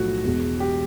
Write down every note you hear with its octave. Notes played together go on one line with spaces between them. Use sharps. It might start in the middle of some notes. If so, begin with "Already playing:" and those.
Already playing: B1 A2 F3 A3 F#4
E1 E2 B2 G#3
G4